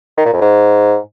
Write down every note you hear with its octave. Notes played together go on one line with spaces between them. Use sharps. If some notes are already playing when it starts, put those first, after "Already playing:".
D#3
A#2
F2
G#2